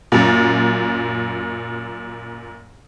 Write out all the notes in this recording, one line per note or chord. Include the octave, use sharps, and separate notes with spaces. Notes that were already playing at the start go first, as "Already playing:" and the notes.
F#2 A#2